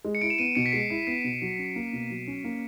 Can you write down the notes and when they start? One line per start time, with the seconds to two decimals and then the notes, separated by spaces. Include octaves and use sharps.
0.05 G#3
0.15 C#7
0.21 E4 D7
0.30 E7
0.38 B3 D#7
0.55 B2 C#7
0.66 B6
0.72 G#3 C7
0.90 E4
1.07 B3 C7
1.24 B2
1.42 F#3
1.59 C#4
1.76 A#3
1.93 B2
2.10 F#3
2.27 C#4
2.44 A#3